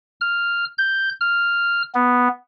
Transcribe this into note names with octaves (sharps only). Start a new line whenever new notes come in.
F6
G6
F6
B3